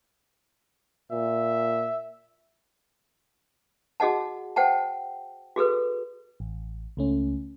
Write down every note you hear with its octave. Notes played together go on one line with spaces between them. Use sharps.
A#2 E5
F#4 G#4 D#5 F#5 A5
C5 F#5 G5 A5
F#4 G#4 A4 B4
A1
C#2 A3 C#4